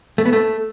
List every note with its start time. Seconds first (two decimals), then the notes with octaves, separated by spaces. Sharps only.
0.18 A3
0.26 B3
0.33 A3